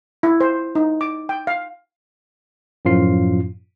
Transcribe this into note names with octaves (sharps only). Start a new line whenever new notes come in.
E4
C5
D#4
D6
G5
F5
F#2 A2 F3 F4 C7